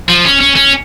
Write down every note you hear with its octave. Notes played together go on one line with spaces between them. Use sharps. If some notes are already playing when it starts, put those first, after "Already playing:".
F3
C#4
C#4
C#4